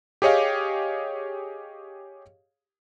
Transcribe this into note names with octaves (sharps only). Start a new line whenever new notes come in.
G4 G#4 C#5 D#5 F5